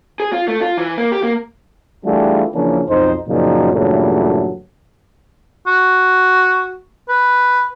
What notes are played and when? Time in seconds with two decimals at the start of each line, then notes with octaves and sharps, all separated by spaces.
0.20 G#4
0.33 F4
0.48 A3
0.61 F4
0.77 E3
0.97 A#3
1.12 G4
1.23 A#3
2.05 E3 G3 A3 D4 F4 G#4
2.54 C#3 E3 F3 A#3 C#4 D4
2.89 B1 F2 D#4 C5
3.29 F#2 A#2 C#3 F3 F#3 D#4
3.73 G2 A#2 C#3 E3 F#3 A3
5.67 F#4
7.09 B4